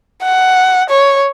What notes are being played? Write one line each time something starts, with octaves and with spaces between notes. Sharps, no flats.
F#5
C#5